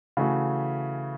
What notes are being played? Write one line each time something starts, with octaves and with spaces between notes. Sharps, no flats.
C#3 E3 A3 C#4 F#4